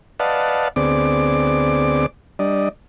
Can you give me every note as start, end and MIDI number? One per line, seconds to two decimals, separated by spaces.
0.19 0.68 71
0.19 0.68 74
0.19 0.68 75
0.19 0.68 77
0.19 0.68 78
0.19 0.68 81
0.76 2.06 38
0.76 2.06 59
0.76 2.06 60
0.76 2.06 68
0.76 2.06 74
0.76 2.06 86
2.39 2.69 55
2.39 2.69 62
2.39 2.69 74
2.39 2.69 75